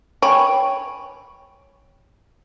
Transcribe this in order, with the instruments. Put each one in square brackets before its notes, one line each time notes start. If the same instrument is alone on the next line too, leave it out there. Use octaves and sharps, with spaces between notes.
[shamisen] C#5 [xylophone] G5 G#5 B5